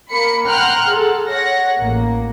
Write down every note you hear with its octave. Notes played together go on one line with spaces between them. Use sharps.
A#3 B5 C#7
F#5 G5 A#5 C6 F6 F#6
G#4 A4
C#5 F#5 A#6
A1 A#3